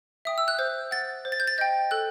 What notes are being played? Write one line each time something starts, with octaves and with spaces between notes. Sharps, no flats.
E5 G5 D#6
E6
F#6
C5 G6
F#5 A6
C5
A6
G6
A6
D#5 G5 G6
A4 F#6